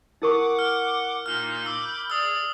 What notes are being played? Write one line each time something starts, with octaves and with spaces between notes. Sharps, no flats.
E4 A#4 F#5 C#6 D6
F6
A#2 A#3 D#4 F6
B5 D6 E6 G6
G#4 D5 D#6 E6